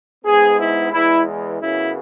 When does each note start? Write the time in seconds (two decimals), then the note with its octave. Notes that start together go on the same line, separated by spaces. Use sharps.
0.24 G#2 G#3 B3 G#4
0.59 E4
0.92 E2 E3 G#3 E4
1.59 F#2 C#3 F#3 B3 E4